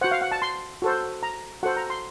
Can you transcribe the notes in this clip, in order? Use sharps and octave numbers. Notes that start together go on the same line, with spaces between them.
F#4 C5 F#5
F5
F#5
A5
C6
F#4 A4 C5
A#5
F#4 A4 C5 F#5
A#5
C6